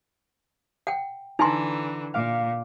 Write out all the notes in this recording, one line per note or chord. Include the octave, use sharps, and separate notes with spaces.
F#5 G5
D3 E3 D#4 G#5 A#5 C6 A6 C7
A#2 F5 D6